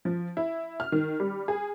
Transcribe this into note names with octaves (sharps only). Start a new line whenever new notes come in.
F3
E4
F6
D#3
G3
G#4